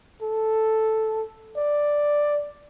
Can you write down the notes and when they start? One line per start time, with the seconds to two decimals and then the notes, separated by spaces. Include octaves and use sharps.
0.22 A4
1.57 D5